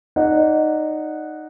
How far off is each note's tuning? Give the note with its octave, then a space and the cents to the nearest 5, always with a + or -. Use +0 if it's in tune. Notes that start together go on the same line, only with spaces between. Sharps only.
D#4 -10 D5 -25 F#5 -5